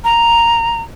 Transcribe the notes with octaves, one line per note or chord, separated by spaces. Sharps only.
A#5